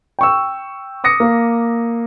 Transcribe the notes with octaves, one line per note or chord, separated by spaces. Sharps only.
G5 C#6 E6
D6 D#6 A#6 C#7
A#3